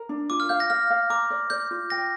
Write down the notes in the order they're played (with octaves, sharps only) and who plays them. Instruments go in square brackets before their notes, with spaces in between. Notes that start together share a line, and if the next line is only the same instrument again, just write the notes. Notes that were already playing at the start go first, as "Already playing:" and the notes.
Already playing: [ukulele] A#4
D4
[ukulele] F4 [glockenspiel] D6
[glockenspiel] F6
[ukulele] F5 [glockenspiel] G6
[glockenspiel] A#6
[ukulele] F5 [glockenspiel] F6
[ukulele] F5
[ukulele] A#5 [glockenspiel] D6
[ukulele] D5
[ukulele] D5 [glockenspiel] G6
[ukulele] F4
[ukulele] G5 [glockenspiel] A#6